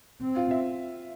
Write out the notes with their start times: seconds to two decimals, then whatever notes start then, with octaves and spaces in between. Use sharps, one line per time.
0.21 C4
0.36 F4
0.51 E5